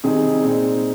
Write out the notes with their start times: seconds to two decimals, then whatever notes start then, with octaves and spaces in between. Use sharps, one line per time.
0.04 C3 D#3 G3 C4 D#4 G#4
0.41 A#2 G#3 C4 D#4